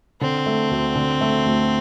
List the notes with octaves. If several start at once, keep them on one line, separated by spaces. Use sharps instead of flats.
D3 C4
A3
D2
D3
A3
D2